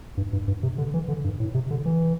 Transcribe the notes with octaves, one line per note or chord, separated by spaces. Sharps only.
G2
G2
G2
C3
D3
E3
D3
G2
A2
C3
D3
E3